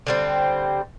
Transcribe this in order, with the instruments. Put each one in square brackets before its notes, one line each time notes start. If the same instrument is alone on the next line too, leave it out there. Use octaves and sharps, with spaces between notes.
[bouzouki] D3 G3 C4